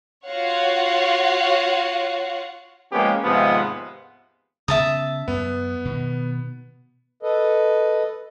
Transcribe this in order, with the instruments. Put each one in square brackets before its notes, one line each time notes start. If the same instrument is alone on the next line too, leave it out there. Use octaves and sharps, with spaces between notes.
[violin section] F4 F#4 C#5 F5 F#5
[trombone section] F3 G#3 A#3 B3 C#4 G4
D#2 G#2 C3 F3 B3 F4
[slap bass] C#3 B3 [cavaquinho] E5 A5 D#6
[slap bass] F#2 [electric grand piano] B3
[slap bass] B2 D#3
[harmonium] A4 B4 D#5